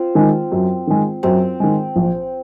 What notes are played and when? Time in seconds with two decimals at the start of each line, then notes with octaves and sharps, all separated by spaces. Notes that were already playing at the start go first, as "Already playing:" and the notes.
Already playing: C4 F4
0.15 D#3 G#3
0.52 F#2
0.87 D#3 G#3
1.23 F#2 C4
1.60 D#3 G#3
1.96 A#1